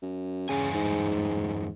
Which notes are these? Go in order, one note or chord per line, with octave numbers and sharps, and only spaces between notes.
F#2
E2 G2 C#3 G#5
G#2